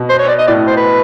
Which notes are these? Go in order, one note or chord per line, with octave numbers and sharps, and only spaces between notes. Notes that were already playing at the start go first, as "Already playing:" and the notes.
Already playing: B2
C5
C#5
D5
D#5
A2 D5
C5
B4